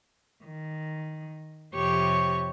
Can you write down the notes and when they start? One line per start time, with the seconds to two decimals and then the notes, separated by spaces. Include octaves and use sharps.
0.44 D#3
1.73 F2 C3 G4 C#5 C#6